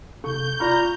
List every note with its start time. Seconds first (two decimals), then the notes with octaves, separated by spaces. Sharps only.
0.24 C3 A4 C#6 G6
0.60 F4 D5 A#5 B5 C#6 F6